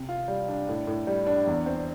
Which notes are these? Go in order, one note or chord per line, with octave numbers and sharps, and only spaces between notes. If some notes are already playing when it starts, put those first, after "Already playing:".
Already playing: C3
F4
G3
D4
A2
A2
G3
D4
E2
C4